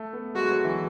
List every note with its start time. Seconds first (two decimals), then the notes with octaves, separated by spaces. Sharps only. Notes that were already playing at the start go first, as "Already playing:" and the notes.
Already playing: A3
0.13 B3
0.35 G#3 F#4
0.50 F#3
0.64 E3